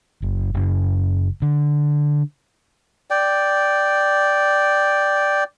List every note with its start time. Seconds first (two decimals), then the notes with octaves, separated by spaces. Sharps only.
0.22 F#1
0.54 F#1
1.42 D3
3.10 D5 G5